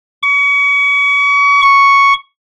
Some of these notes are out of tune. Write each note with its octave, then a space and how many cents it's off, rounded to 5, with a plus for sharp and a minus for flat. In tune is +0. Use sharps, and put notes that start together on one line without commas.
C#6 +35
C#6 +0